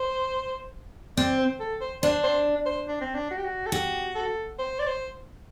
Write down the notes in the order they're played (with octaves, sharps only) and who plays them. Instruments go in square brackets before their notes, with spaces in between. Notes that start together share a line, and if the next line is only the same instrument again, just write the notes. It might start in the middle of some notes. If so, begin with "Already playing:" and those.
Already playing: [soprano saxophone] C5
[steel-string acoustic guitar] C4 [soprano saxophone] D5
[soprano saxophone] C5
A4
C5
[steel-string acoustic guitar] D4 [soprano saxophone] C5
[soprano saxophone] C5
C5
D4
C4
D4
F#4
G4
F#4
A4
[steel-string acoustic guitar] F#4 [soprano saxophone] G4
[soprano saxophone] A4
C5
D5
C5